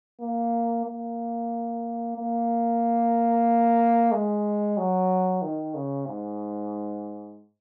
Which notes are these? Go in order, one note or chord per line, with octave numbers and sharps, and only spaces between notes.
A#3
A#3
A#3
G#3
F#3
D#3
C#3
G#2